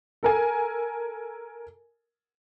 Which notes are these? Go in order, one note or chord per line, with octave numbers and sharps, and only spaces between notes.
A4 A#4 G#5